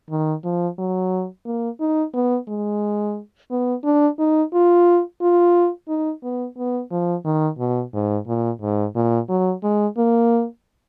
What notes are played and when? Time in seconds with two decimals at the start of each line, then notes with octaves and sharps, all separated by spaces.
0.10 D#3
0.44 F3
0.78 F#3
1.46 A#3
1.80 D#4
2.14 B3
2.48 G#3
3.51 B3
3.84 D4
4.19 D#4
4.53 F4
5.21 F4
5.88 D#4
6.23 B3
6.57 B3
6.91 F3
7.25 D#3
7.59 B2
7.94 G#2
8.27 A#2
8.62 G#2
8.95 A#2
9.29 F#3
9.63 G#3
9.97 A#3